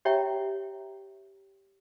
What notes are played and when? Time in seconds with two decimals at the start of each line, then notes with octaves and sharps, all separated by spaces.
0.05 G4 C#5 E5 G5 A#5